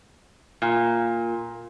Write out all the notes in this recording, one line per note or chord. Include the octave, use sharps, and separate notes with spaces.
A#2